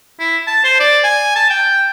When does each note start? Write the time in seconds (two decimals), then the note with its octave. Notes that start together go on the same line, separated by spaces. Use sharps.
0.20 E4
0.47 A5
0.64 C5
0.80 D5
1.04 G#5
1.36 A5
1.50 G5